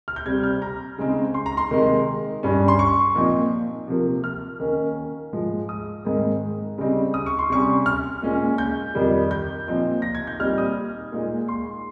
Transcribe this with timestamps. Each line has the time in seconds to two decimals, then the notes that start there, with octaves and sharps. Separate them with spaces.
0.08 F6
0.16 G6
0.25 C3 G3 C4 G#6
0.43 F6
0.62 A#5
0.98 C#3 G#3 C4 D#4
1.34 C6
1.46 A#5
1.57 C6
1.71 C3 D#3 G#3 D#4
2.43 G2 G3 C#4
2.68 C6
2.79 C#6
3.15 A#2 F3 C4 D#4
3.88 C3 F3 A#3
4.24 F6
4.60 D#3 A#3 C#4
5.33 G#2 F3 G#3
5.69 D#6
6.05 G#2 D#3 G#3 C4
6.78 C#3 G3 C4 D#4
7.14 D#6
7.26 C#6
7.39 C6
7.50 C3 G3 C#4 C#6
7.86 F6
8.22 A#2 G#3 C#4
8.58 G6
8.95 F2 D#3 G3
9.31 G6
9.68 A#2 F3 C4 D#4
10.02 A#6
10.15 G#6
10.27 G6
10.40 A#2 G3 C4 D#4 F6
10.58 D#6
11.12 A#2 G#3 D#4
11.48 C6